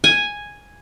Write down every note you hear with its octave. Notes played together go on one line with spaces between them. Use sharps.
G#5